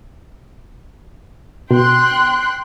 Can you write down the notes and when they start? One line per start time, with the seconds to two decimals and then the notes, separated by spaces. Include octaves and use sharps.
1.71 B2 G5 C6 F#6